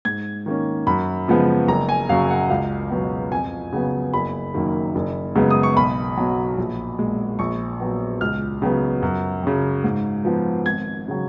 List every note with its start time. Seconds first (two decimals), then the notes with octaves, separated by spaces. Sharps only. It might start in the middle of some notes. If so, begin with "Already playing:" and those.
0.05 G#2 G#6
0.46 D#3 A#3 C#4
0.87 F#2 B5
1.28 C#3 F3 G#3 B3
1.68 F#1 A#5
1.89 G#5
2.09 F#2 C#3 F#3 C#4 F5
2.30 F#5
2.50 C#2 F5
2.90 B2 F#3 B3
3.32 F2 G#5
3.73 C#3 F#3 B3
4.13 F#1 B5
4.54 F#2 D#3 A#3
4.95 F#1
5.35 F#2 C#3 G#3 B3
5.50 D#6
5.63 C#6
5.76 B1 B5
6.17 B2 F#3
6.58 A#1
6.99 A#2 G#3
7.39 A#1 C#6
7.80 A#2 F#3 B3
8.21 C#2 F6
8.62 C#3 F#3 B3
9.02 F#2
9.43 C#3 F#3
9.84 G#2
10.25 F3 B3
10.66 G#1 G#6
11.08 C#3 F#3